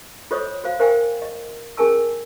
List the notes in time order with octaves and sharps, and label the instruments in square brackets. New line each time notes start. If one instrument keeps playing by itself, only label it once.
[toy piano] F4 A4 C5 C#5 D#5 D#6
F#4 C5 F5
A#4 C5 E5 F5 G5 G#5
D#5
C#4 G#4 A#4 G#5 A5 E6